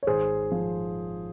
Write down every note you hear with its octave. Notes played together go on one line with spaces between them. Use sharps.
C#5
G#1 G#4 C5
F3